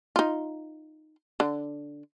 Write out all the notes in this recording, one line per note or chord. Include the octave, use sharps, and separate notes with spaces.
D#4 F4
D3